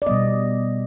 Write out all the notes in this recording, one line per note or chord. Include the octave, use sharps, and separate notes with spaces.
D5
B2 G3 B3 D#5